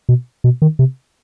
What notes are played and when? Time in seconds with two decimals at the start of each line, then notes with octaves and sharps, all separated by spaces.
0.09 B2
0.44 B2
0.62 D#3
0.79 C3